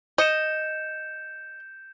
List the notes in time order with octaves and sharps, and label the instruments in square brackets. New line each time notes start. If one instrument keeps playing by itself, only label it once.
[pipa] D#5 [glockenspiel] G6 C#7 E7